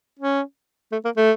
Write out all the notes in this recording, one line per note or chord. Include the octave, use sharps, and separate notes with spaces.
C#4
A3
A#3
A3